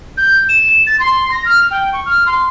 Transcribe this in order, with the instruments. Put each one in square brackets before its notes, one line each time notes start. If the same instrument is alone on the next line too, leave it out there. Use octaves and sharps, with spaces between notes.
[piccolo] G6
E7
A6
C6
A#6
F6
G5
C#6
F6
C6